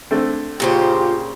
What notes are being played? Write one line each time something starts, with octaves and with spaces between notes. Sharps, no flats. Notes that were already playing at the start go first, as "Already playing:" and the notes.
D3 A3 C4
A#2 C#3 F4 G4 C5